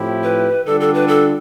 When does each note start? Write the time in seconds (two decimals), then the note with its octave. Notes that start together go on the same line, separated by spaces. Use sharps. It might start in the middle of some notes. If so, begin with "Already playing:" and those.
Already playing: A2 F3 C4 E4 G4
0.23 B4
0.65 D3 G3 D4 F4 A4
0.81 A4
0.94 B4
1.08 A4